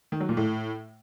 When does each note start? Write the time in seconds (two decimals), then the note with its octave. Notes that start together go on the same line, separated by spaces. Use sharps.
0.12 D#3
0.20 F#3
0.29 A#2
0.37 A2